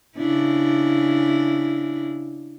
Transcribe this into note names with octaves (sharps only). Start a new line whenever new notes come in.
C#3 D4 E4